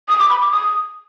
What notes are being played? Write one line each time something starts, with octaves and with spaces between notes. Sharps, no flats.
D#6
D6
B5
D6
D#6